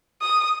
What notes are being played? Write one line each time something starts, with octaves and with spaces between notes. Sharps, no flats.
D#6